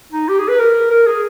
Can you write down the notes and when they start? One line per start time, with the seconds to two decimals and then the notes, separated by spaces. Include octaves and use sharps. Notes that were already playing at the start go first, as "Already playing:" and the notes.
0.12 D#4
0.29 G4
0.39 G#4
0.49 B4
0.59 A#4
0.91 A#4
1.07 G#4